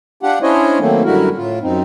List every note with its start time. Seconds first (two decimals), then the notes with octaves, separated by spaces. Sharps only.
0.23 D4 F4 G4 F#5
0.42 C#4 D4 E4 C5 C#5 D#5
0.80 D#3 F#3 A3 A#3 C4
1.05 F#2 D3 G3 E4 F#4 A#4
1.37 A2 F4
1.63 F#2 C4 D#4